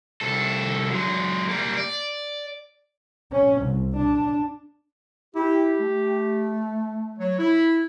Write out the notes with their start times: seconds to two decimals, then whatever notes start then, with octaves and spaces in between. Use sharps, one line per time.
0.21 C2 A4
0.90 F#3 G#3
1.49 G3 A#3
1.77 D5
3.32 C#4
3.62 C2
3.96 D4
5.35 E4 G4
5.80 A3
7.19 F#3 C#5
7.39 E4